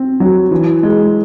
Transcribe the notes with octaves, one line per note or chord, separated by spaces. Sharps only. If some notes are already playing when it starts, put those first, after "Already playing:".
Already playing: C4
F#3
E3
G#3